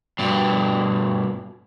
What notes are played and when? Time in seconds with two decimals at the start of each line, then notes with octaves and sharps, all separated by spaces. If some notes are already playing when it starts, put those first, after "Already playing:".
0.19 G2 B2